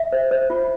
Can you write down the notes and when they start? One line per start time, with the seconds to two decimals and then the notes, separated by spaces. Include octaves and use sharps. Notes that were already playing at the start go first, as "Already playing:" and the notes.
Already playing: E5
0.12 C5
0.31 C5
0.50 F4